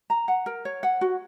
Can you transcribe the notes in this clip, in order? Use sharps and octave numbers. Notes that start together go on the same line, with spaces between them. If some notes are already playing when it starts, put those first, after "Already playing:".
A#5
F#5
A#4
C#5
F#5
F#4